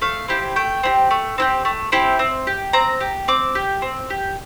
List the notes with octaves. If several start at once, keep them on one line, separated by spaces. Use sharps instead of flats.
A3 F5
C4 E4 G4
A3 G5
C4 E4 G4
A3
C4 E4 G4
A3
C4 E4 G4
C4
G4
C4 A#5
G4
C4 D6
G4
C4
G4